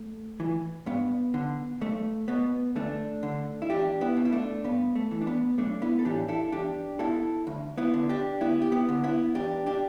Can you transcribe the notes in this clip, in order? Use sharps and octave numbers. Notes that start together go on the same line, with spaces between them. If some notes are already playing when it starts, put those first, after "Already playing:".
Already playing: A3
E3
G2 B3
D3
B1 A3
B2 B3
D2 A3 D4
D3
E4
E2 D4 G4
B3 E4
B2
E4
A3 D4
G2 B3
A3
E3
D4
B3
B1 A3 D4
B3 E4
A4
A2 E3 D4 G4
E4 A4
E2 D4 G4
B2 E4 A4
D2
B3 E4
D3
D4 G4
D2 B3 E4
G4
B3 E4
D3
B3 E4
E2 D4 G4
D4 G4